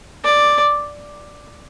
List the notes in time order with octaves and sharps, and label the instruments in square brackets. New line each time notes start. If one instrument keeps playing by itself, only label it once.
[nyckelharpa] D5